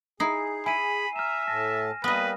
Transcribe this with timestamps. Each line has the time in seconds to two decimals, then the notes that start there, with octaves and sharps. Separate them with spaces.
0.20 D#4 E4 G#4 C7
0.66 E4 G#5 B5 D#7
1.16 E5 A#5 F6 E7
1.48 A2 A5 A#6
2.04 G3 A#3 B3 B4 D#5